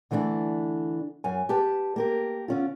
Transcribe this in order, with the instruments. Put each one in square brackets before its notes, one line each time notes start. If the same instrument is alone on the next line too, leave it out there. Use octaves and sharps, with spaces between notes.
[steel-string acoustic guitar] D3 E3 A3 C4 D4
F#2 G#5
G4 B4 A5
A#3 G4 A#4
D3 C#4 F4